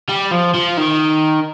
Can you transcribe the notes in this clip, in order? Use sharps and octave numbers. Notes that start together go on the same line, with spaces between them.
G3
F3
F3
D#3